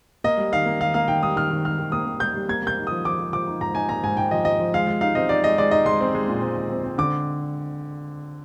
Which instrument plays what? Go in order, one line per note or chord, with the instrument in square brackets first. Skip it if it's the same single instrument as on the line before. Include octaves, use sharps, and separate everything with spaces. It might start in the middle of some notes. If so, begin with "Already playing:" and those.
[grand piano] A#3 D#5
G3
D#3 F5
A#3
D#3 F5
A#3 F5
D#3 G5
G3 D#6
D#3 F6
D#3
D#3 F6
D#3
A#3 D#6
A#3
G3 G6
G3
A#3 G#6
A#3 G6
D#4
F3 D#6
F3 D6
F3
F3 D6
D#4
G#2 A#5
D#4 G#5
A#3 A#5
G#2 G#5
G#2 G5
F3 D#5
F3 D#5
F3
G#3 F5
G#3
D#4 F5
C4 D#5
D#4 D5
G#3 D#5
G#3 D5
D#4 D#5
G#3 C6
C4
G#3
A#2
C4
G#3
C4
C4
D3 D6